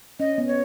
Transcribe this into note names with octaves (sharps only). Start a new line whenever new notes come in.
C#4 D#5
B3
C#5